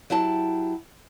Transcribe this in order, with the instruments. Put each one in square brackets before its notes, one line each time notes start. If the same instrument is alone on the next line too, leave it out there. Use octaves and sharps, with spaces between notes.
[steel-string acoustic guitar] F#3 E4 G4 A5